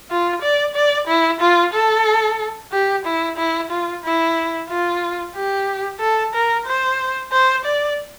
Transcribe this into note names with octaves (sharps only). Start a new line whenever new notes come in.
F4
D5
D5
E4
F4
A4
G4
E4
E4
F4
E4
F4
G4
A4
A#4
C5
C5
D5